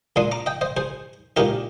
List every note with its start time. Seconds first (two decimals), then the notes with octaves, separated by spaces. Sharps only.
0.16 A#2 G#3 D4 C6 D#6
0.32 A#5 D6
0.46 D#5 G5
0.61 C5 D#5
0.77 G#4 C5
1.37 A#2 G#3 D#4 G4 A#4